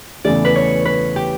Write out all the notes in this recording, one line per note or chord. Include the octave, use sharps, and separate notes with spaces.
E2 C#3 E3 A3 D5
B4
C#5
B4
G4